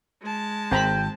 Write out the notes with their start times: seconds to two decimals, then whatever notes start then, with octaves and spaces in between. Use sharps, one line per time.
0.23 G#3 A5
0.71 G#1 C4 G5 A#5 B5